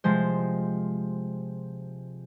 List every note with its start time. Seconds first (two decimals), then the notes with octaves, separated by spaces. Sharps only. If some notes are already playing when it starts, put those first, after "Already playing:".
0.04 C3 F3 G#3 C5